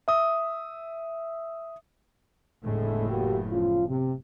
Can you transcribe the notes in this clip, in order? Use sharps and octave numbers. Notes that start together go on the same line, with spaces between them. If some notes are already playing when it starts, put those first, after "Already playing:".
E5 D#6
F#1 E2 A2 D3 G#3 A3
A#3 F#4 G4
C#3 F3 F4
C3